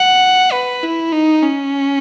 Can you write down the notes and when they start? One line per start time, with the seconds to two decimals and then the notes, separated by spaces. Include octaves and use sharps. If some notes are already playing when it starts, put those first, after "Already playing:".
Already playing: F#5
0.52 B4
0.83 E4
1.12 D#4
1.42 C#4